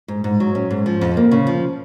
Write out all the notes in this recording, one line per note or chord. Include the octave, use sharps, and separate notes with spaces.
G#2
G#2
F#3
C#4
G#2
F3
F2
A#3
C#3
F3